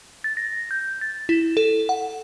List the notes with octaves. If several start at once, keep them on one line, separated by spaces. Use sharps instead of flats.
A6
A#6
G6
A6
E4
A4
F#5